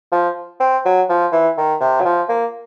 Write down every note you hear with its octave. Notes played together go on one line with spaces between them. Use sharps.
F3
C4
F#3
F3
E3
D#3
C3
F#3
F3
A#3